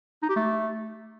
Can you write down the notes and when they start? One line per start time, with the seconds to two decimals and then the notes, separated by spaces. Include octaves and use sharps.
0.23 D#4
0.29 G4
0.36 A3